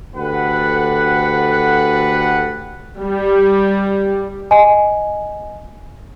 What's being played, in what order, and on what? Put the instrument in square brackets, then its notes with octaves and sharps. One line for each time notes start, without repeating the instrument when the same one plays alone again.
[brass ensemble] D2 G4 A4 B4 F#5
[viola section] G3
[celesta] D#5 G#5